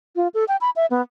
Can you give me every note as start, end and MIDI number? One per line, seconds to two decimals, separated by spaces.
0.16 0.28 65
0.34 0.45 69
0.48 0.57 79
0.61 0.70 83
0.76 0.86 76
0.91 1.02 59